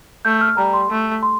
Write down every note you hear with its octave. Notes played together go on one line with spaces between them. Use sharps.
A3 G6
F6
G3 A#5
C6
A3
C6